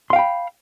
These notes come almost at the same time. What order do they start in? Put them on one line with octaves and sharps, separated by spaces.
C6 F5 G5 B5